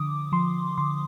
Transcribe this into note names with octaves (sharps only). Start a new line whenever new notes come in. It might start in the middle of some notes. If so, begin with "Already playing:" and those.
Already playing: D3 F3 D6 D#6
F3 C6
D3 C6